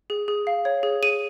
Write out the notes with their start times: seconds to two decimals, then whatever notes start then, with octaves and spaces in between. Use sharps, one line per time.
0.10 G#4
0.28 G#4
0.47 F5
0.65 C#5
0.83 G#4
1.03 G#4 D#7